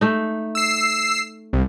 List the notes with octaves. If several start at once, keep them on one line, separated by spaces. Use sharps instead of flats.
A3 D#4
E6 C7
C2